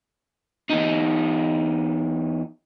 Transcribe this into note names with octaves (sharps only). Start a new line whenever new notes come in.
E2 D#4